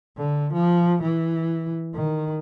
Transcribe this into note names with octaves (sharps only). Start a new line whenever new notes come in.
D3
F3
E3
D#3